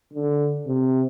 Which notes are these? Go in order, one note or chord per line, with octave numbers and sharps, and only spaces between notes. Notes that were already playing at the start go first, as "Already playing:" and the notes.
D3
C3